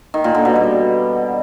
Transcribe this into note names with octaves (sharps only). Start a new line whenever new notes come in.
D#3
A#2
D3
B2
G3